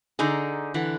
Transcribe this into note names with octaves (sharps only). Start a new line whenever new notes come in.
D3 D#4 G#4 D5 A#5
D3 E3 F#5